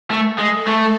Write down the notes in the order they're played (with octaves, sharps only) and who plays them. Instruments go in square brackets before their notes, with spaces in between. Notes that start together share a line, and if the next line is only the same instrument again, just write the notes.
[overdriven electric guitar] A3 [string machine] A#4
[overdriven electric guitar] G#3 [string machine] A4
[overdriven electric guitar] A3